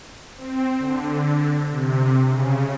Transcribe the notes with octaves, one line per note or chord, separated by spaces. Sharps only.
C4
D3
C3
C#3